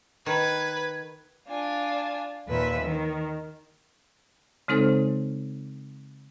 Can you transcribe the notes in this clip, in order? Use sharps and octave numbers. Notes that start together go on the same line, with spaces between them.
D#3 B4 G#6
D4 F4 G#5
D#2 A#2 B4 E5
D#3
C#3 G#3 C4 D#4 A4 C5